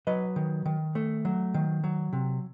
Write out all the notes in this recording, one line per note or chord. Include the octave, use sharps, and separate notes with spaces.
F#3 B4 D#5
D#3
D#3
A3
F#3
D#3
F#3
C3